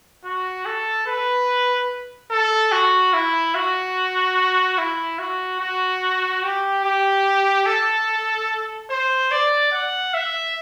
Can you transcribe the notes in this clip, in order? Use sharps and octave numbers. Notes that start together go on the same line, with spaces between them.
F#4
A4
B4
A4
F#4
E4
F#4
E4
F#4
F#4
G4
G4
A4
C5
D5
F#5
E5